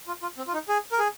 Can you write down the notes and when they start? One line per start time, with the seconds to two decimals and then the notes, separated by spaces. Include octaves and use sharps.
0.08 F4
0.22 F4
0.38 C4
0.47 F4
0.54 D#4
0.69 G#4
0.92 A#4
0.99 G#4